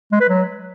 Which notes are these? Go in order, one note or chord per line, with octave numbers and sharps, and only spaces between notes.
G#3
B4
F#3